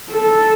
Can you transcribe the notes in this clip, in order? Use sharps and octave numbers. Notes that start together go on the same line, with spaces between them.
A4